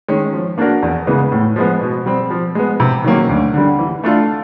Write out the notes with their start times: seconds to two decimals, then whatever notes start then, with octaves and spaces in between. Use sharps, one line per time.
0.08 D#3 G#3 C#4
0.33 F3
0.58 A#3 D4 F#4 A#4
0.83 E2
1.07 C#3 E3 G#3 B3
1.32 A2
1.56 F3 G#3 B3
1.81 B2
2.06 G3 C4
2.30 F3
2.55 G#3 B3
2.80 C3
3.04 D#3 F#3 A#3 C#4
3.29 D2
3.54 D3 G3
3.79 E3
4.03 A3 D4 F4 A4